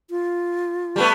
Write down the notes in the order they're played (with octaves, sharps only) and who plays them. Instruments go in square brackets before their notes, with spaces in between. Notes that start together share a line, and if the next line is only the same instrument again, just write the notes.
[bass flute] F4
[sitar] G3 A3 B3